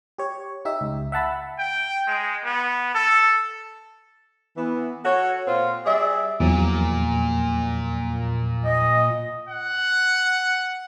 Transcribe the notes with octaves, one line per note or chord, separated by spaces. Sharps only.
G4 C#5
D#4 G4 E5
C#2
E5 F#5 A5 B5
G5
G#3
B3
A4
E3 B3
F#4 A4 C#5
A#2 C4 F4
G3 G#4 D5 E5
E2 A#2 F3 F#3
D#5
F#5